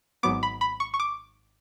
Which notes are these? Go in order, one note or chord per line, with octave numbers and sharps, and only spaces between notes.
G#1 G#2 F#3 B3 D6
B5
B5
C#6
C#6
D6